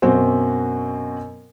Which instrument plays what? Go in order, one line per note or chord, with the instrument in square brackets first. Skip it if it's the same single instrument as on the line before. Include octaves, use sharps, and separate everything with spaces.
[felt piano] F#2 B2 C4 F#4 C5